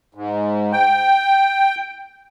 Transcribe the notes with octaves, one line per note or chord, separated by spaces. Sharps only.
G#2
G5